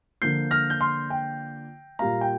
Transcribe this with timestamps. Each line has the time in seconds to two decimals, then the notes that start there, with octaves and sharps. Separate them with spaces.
0.22 D3 F3 A#3 G6 C7
0.51 F6 A#6
0.70 G6
0.81 C6 F6
1.10 G5
1.99 A#2 G3 A#3 F5 A#5
2.21 G5